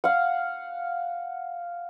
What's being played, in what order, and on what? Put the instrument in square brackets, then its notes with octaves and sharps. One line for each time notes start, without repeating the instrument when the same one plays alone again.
[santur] F5 F#5